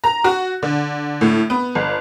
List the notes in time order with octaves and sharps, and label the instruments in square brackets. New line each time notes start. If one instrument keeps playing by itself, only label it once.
[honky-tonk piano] A#5
F#4
D3
A2
B3
G1